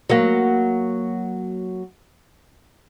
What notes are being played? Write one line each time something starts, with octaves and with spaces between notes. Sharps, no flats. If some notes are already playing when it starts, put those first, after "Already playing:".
F#3 A#3